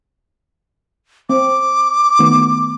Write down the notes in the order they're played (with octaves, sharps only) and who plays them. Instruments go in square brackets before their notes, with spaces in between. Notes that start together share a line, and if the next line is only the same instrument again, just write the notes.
[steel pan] C4 [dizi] D6
[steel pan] D#3 A3 B3